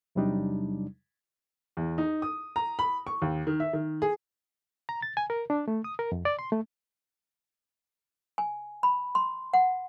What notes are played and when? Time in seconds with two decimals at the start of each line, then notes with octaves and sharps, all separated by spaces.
0.15 E2 C3 F#3 G3 D4 D#4
1.77 E2
1.98 D#4
2.22 D#6
2.56 A#5
2.79 B5
3.07 C#6
3.22 D#2
3.47 D#3
3.60 E5
3.73 D#3
4.02 G#4
4.89 A#5
5.02 A6
5.17 G#5
5.30 A#4
5.50 D4
5.68 A3
5.84 D#6
5.99 A#4
6.12 F2
6.25 D5
6.39 C6
6.52 A3
8.38 G#5
8.83 B5
9.15 C6
9.53 F#5